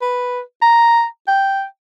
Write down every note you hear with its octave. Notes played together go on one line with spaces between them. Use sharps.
B4
A#5
G5